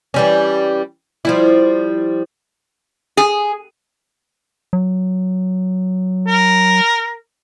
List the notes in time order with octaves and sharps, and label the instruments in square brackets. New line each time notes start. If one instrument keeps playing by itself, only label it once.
[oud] E3 G3 C#4
F3 G3 E4
[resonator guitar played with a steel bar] G#4
[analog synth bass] F#3
[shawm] A#4